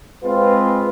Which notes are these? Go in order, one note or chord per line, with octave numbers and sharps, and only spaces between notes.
G#3 C4 F4 B4